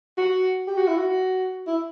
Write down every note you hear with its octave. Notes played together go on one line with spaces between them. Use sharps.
F#4
G4
F#4
E4
F#4
E4